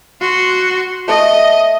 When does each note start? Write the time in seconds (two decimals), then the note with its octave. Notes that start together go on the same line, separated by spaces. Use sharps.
0.21 F#4 C6
1.08 A3 D#5 A5